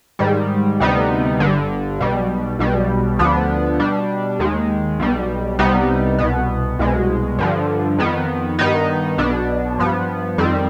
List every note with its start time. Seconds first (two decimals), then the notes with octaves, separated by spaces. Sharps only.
0.19 G#2 D#3 G3
0.80 D2 C3 G3 B3 D#4
1.39 G1 G2 D3
1.99 B1 B2 G3
2.59 B1 B2 G3
3.19 D2 D3 F3 B3 D4
3.79 B2 G3 D4
4.39 D#2 D#3 G#3
4.99 B1 B2 G3
5.59 C2 C3 G3 B3 D#4
6.18 C2 B2 B3
6.79 C2 B2 G#3
7.39 G2 D3 F3
7.99 F2 D#3 B3
8.59 G2 D#3 B3 D#4
9.18 B1 B2 B3 D4
9.78 G2 F3 B3
10.38 F2 D#3 G3 C4